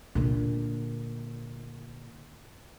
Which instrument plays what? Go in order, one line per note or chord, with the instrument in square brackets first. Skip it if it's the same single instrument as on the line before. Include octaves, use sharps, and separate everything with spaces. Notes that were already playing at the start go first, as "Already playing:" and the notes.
[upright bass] A#2 D3